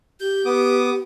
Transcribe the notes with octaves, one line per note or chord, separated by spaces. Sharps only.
G4 G6
B3 D6 D#6